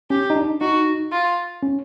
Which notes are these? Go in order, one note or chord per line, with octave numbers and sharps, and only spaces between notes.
C#4 G4
D#4
D4
D#4 F#4
F4
C#4